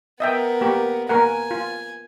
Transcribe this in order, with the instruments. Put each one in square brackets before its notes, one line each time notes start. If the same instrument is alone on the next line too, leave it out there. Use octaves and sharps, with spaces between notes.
[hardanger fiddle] B3 A#4 [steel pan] D#5 E5 G5
[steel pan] A#3 G4
[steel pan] A#3 A#4 F#5 [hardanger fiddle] G#5
[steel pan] F4